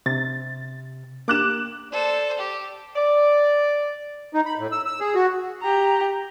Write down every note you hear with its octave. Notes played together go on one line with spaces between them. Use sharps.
C3 A6
A#3 G4 D6 F#6 E7
A4 C5 D5
G4
D5
D#4
B5
A2
E6
E6
G#4
F#4
G4 A#5